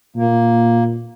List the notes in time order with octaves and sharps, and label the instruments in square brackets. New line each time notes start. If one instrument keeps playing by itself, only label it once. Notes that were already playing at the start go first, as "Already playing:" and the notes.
[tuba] A#2 [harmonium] A#3